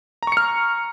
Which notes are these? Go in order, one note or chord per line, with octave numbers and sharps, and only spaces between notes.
A#5 C#6 F6 C#7